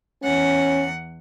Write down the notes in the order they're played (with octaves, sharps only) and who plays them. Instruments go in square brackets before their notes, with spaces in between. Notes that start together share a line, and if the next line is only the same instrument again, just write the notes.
[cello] E2 F#5 [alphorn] C#4